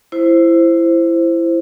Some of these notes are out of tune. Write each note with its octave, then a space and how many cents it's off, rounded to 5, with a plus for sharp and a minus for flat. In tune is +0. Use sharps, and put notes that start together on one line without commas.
E4 +20 C5 +0